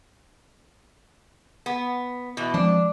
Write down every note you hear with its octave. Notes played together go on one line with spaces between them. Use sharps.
B3
B2 E3
F3 G#3 C4 D4